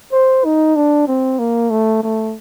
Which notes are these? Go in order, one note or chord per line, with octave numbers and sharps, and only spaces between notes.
C5
D#4
D4
C4
A#3
A3
A3